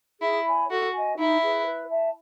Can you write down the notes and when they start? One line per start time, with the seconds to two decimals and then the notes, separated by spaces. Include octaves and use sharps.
0.21 E4 G#4
0.45 C#5 G#5 B5
0.69 F#4 A4
0.93 D#5 G#5
1.18 D#4 E4
1.42 G#4 B4
1.66 B4
1.90 E5 A5